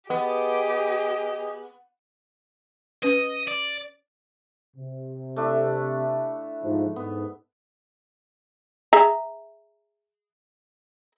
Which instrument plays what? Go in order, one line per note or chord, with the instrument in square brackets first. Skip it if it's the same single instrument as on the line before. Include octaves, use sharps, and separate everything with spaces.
[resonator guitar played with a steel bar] B3 [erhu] G4 [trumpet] G#4 [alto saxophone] D#5
[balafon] C#4 B4 [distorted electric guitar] D#5
[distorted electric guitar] D5
[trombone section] C3
[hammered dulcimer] A3 D4 E4
[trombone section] G#2 F3
[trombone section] G#2 [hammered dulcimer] B3
[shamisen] G#4 E5 A#5